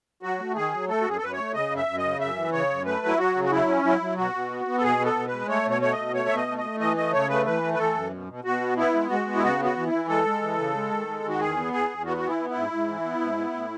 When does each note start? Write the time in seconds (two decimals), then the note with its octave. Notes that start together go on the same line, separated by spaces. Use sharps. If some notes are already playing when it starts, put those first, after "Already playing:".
0.23 F#3 F#4
0.39 A3
0.56 D#3 G#4
0.72 F#3
0.88 A3 A4
1.01 F#4
1.05 F#2 G#4
1.17 A4
1.21 F#2 B4
1.32 C#5
1.38 A3
1.54 C#3 D#5
1.71 F#2
1.77 E5
1.88 F#2
1.98 D#5
2.04 C#3
2.20 F#2 E5
2.36 E3
2.53 C#3 C#5
2.70 F#2
2.85 A3 B4
3.02 F#3
3.07 E4
3.18 F#3 F#4
3.35 C#3
3.44 F#4
3.51 F#3 E4
3.68 C#4
3.85 F#3 E4
4.01 F#3
4.17 B2 F#4
4.34 B2
4.50 B3
4.66 B3
4.78 A4
4.83 B2 G#4
4.99 B3
5.05 A4
5.16 B2
5.27 B4
5.32 G#3
5.48 A3 C#5
5.65 B2
5.70 C#5
5.82 A3 C#5
5.92 D#5
5.98 B2
6.14 A3 C#5
6.29 B2 E5
6.36 D#5
6.47 A3
6.58 D#5
6.64 A3
6.80 E3 D#5
6.97 A3 D#5
7.13 C#3 C#5
7.29 A3 B4
7.46 E3 B4
7.62 A3
7.74 B4
7.78 E3 A4
7.95 F#2
8.11 B2
8.28 B2
8.44 B2 F#4
8.61 B3
8.77 B3 E4
8.94 G#3
9.10 G#3 F#4
9.26 B3
9.36 E4
9.43 C#3 F#4
9.59 B3
9.65 F#4
9.76 E3
9.87 E4
9.92 E3
10.09 G#3 A4
10.25 G#3
10.42 E3
10.58 C#3
10.75 G#3
10.91 D#3
11.07 G#3
11.24 D#3
11.29 F#4
11.40 E2 G#4
11.56 B3
11.73 E2 G#4
11.90 E2
12.06 B3 F#4
12.17 F#4
12.22 E3
12.28 E4
12.39 B3
12.50 E4
12.55 G#2
12.72 G#2
12.88 E3
13.04 B3
13.21 G#2
13.38 B3
13.53 A2